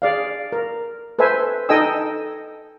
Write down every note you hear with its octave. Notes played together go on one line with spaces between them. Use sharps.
G#4 D5 F5
A#4
A4 B4 C5 E5 G#5
D#4 A4 D#5 G5 G#5 E6